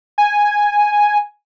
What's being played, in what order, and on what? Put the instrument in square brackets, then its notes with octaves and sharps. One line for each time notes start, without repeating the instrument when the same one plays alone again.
[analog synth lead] G#5